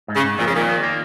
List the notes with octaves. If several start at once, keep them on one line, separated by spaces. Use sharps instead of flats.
G#2
C#3
G#2
F2 A#2
C#3
A#2 D#3
D#3
A#3